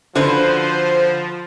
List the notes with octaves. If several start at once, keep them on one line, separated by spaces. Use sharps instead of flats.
D3 F3 F#4 B4 C5